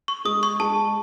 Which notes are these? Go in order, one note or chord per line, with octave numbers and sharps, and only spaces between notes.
C#6
G#3 D#6
C#6
G#3 A5